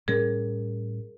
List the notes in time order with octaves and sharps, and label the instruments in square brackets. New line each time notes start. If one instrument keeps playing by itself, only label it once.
[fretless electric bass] A2 G3 C#4 [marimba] G#4 A#4